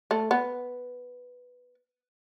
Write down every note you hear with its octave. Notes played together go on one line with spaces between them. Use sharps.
A3
B3